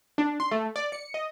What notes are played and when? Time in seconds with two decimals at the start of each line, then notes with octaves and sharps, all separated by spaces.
0.18 D4
0.40 C6
0.51 A3
0.76 D5
0.92 C#7
1.14 D#5